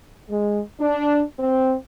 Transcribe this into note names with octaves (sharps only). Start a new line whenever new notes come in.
G#3
D4
C4